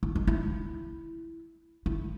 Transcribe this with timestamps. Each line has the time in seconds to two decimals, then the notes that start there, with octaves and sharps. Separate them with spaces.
0.03 E4
0.15 D#4
0.27 E4
1.86 E4